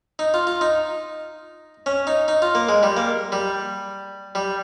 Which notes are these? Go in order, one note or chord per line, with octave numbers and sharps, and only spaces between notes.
D#4
F4
F4
D#4
C#4
D#4
D#4
F4
A#3
G#3
G3
A#3
G3
G3